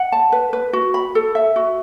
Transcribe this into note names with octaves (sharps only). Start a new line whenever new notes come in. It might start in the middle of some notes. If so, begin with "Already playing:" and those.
Already playing: F#5
A5
B4
B4
F#4
B5
A4
E5
F#4